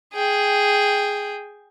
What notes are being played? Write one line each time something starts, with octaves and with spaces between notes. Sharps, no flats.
G#4 G5